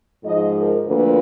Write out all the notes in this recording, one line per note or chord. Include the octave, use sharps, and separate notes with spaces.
G#2 F3 G#3 D#5
A#4
D2 D3 F3 A#3 B4